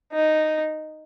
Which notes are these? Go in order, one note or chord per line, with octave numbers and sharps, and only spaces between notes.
D#4